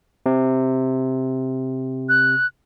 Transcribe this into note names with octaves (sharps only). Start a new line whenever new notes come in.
C3
F#6